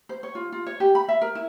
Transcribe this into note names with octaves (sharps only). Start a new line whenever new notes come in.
C5
C#5
F4
F4
C#5
G4
B5
E5
A#4
E4